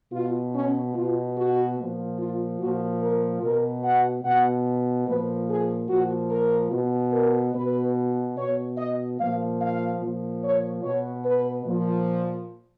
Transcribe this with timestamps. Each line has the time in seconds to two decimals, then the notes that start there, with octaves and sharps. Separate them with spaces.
0.12 B2 F4
0.54 C#4
0.94 B2 F4
1.37 F#4
1.78 A#2 F3
2.18 F4
2.59 A#2 F3 F#4
3.01 A#4
3.42 B2 A#4
3.83 F#5
4.24 B2 F#5
5.07 A#2 F3 B4
5.48 G#4
5.89 A#2 F3 F#4
6.30 A#4
6.72 B2
7.13 A#4
7.54 B2 B4
8.36 B2 C#5
8.77 D#5
9.18 A#2 F3 F5
9.59 F5
10.01 A#2 F3
10.42 C#5
10.83 B2 C#5
11.24 B4
11.66 A#2 F3